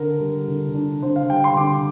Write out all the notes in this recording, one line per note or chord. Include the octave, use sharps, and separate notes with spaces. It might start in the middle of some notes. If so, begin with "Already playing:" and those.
Already playing: D3 A#4
G3
D3
D4
D3 C5
F5
G3 G5
C6
D3 D6